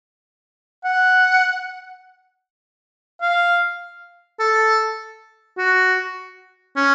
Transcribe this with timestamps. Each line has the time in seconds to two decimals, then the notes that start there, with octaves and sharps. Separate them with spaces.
0.84 F#5
3.21 F5
4.40 A4
5.58 F#4
6.76 C#4